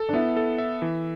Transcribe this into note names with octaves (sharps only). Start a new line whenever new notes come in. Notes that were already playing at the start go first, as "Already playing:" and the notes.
Already playing: A4
D4
B3 E4
A4
E5
E3